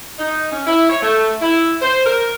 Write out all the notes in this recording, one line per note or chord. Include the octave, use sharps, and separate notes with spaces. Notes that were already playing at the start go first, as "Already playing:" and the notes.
D#4
C#4
E4
C#5
A3
E4
C5
A#4